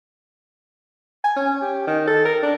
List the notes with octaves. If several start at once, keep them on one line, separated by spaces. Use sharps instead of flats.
G#5
C#4
G4
D#3
A4
A#4
D4